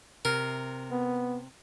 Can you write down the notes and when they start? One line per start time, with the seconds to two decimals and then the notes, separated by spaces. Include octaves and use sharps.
0.25 C3 A#4
0.91 B3